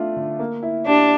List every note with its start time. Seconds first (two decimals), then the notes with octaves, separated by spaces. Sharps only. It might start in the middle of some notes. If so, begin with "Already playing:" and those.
Already playing: A3 D4 F4
0.16 D3
0.39 A#3
0.63 E4
0.86 D4 G4